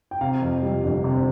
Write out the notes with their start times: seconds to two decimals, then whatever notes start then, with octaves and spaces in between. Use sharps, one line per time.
0.11 G5
0.21 C3 F5 A#5
0.42 F2
0.63 G3
0.83 G1
1.04 C3